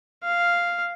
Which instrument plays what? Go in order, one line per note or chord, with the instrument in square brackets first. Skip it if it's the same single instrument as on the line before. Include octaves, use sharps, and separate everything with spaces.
[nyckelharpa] F5